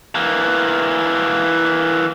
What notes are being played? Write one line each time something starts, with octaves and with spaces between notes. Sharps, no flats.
E3 A#3